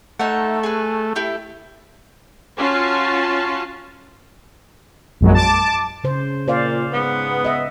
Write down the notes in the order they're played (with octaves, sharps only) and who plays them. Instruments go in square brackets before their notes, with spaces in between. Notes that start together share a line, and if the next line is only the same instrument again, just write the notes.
[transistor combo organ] A3 [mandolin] D#4 E5 F#5
[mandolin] G#4 B4
E4 G4 A4
[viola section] C#4 F4 F#4 F5 A5
[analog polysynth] A#1 F#2 F#3 G#3
A5 D6
[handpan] C#3 C5
[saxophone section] A#2 [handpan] C5 D5 F5
[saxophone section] G#2 B3
[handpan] D#5 E5